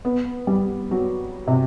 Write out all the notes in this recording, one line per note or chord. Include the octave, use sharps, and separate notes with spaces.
B3
G3
F#3
C3